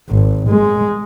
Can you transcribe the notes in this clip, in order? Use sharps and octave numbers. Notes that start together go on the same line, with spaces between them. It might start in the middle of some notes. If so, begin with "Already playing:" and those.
G#1
G#3